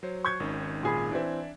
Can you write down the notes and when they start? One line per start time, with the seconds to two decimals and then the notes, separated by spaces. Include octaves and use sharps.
0.03 F#3 C5 C#5
0.25 C#6 G6 G#6
0.40 G#1 D#3 C#4
0.83 A#2 G#4 B5
1.11 E3 C4 D4 D5 E5